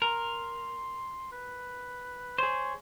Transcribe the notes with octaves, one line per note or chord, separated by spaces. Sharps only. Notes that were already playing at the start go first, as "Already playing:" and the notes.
A#4 C6
B4
G#4 C5 C#5